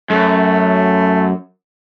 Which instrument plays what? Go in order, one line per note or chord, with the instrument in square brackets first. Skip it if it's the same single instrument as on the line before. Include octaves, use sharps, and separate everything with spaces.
[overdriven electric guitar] F#2 [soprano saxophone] A3